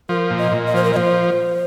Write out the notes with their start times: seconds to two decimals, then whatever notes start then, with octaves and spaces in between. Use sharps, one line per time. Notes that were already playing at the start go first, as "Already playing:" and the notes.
0.09 F3 A#4
0.30 A#2
0.38 D#5
0.52 A#2
0.67 D#5
0.74 F3 C5
0.84 A#4
0.93 D#5
0.96 F3 C5